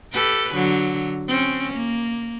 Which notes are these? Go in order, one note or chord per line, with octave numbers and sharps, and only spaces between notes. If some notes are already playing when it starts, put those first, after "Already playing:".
G4 A4 B4
D3 F#3
C4 C#4
A#3